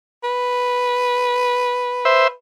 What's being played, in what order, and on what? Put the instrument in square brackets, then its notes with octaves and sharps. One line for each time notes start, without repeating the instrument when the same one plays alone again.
[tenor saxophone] B4
[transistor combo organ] C5 E5